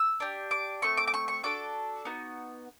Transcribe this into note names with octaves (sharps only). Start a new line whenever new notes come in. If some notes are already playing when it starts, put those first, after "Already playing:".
Already playing: E6
D4 G4
D6
A3 C4 C#6
D6
D6
C#6
C#6
D4 F#4 A4 D6
B3 D#4 F#4